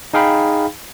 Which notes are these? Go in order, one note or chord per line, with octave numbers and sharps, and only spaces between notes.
D#4 G#4 F5 G5 B5